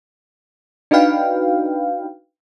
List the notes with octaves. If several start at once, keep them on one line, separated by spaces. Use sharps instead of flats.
D4 D#4 F#4 B4 F5 G5